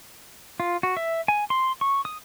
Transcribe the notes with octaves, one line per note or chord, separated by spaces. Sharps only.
F4
F#4
E5
G#5
C6
C#6
D#6